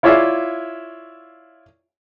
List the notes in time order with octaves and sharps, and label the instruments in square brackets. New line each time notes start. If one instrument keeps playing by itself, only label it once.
[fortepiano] E4 F4 C#5 D5 E5 F5